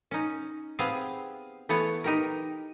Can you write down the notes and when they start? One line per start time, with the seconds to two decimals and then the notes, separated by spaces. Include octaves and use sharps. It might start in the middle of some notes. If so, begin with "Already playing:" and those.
0.11 C#4 D#4
0.79 B3 C4 G4 G#4 F5
1.69 E3 A3 B3 C#5
2.04 D#4 G4 A#4